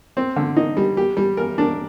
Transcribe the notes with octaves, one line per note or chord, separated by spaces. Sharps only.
C4
D3
D#4
G3
G4
G3
A#4
D4